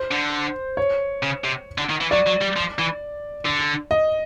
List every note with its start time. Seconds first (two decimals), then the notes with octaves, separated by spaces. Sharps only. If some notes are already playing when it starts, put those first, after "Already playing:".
Already playing: C5
0.11 D3
0.77 C#5
1.23 C#3
1.44 C3
1.78 D3
1.89 D#3
2.01 E3
2.11 F#3 D5
2.26 F#3
2.41 G3
2.56 F3
2.79 E3
3.46 D3
3.91 D#5